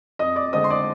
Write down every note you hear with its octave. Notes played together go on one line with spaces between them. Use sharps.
F2 D#5 D#6
D5 D6
D3 G#3 C4 D#5 D#6
C6
D5 D6